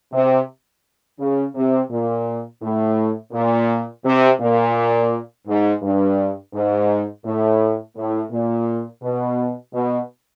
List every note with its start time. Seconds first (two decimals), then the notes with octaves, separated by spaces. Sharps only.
0.13 C3
1.19 C#3
1.55 C3
1.90 A#2
2.62 A2
3.33 A#2
4.05 C3
4.40 A#2
5.47 G#2
5.82 G2
6.53 G#2
7.25 A2
7.96 A2
8.31 A#2
9.02 B2
9.73 B2